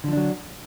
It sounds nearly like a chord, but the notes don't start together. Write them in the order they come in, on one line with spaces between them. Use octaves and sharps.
D3 F3 D4 F#3